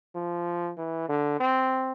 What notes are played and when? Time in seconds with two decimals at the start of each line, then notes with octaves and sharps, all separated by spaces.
0.15 F3
0.78 E3
1.09 D3
1.40 C4